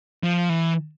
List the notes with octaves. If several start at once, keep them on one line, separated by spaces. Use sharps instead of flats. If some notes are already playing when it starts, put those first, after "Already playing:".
F3
E3